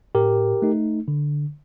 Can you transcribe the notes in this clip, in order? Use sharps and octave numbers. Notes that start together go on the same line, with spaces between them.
A2 G4 A#4
A3 D#4
D3